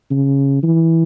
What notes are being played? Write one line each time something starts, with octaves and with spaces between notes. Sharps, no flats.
C#3
E3